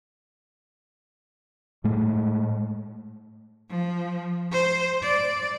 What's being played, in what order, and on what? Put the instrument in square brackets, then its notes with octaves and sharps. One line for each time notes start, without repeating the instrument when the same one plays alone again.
[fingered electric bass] A2 G#3 A3
[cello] F3
C5
D5